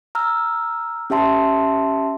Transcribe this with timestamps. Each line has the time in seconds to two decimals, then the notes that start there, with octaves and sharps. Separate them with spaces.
0.15 A#5 E6 F6
1.10 C#4 G4 E5 A5 C6